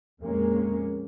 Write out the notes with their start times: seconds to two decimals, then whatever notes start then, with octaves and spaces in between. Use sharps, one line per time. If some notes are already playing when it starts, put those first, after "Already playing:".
0.20 F2 A#2 G#3 A#3 C#4